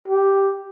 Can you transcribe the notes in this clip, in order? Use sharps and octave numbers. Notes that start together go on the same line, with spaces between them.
G4